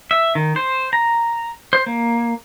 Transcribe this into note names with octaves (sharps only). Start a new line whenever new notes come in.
E5
D#3
C5
A#5
C5
A#3